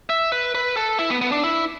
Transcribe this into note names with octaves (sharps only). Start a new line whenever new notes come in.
E5
B4
B4
A4
E4
B3
B3
D4
E4